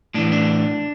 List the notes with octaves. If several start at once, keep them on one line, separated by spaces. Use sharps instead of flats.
A2 E3 D4
D4